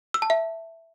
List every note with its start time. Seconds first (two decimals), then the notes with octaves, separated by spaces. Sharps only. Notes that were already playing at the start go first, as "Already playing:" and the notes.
0.14 E6
0.22 A5
0.30 E5